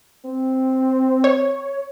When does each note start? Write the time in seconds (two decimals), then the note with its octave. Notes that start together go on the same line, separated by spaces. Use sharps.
0.25 C4
1.24 C#5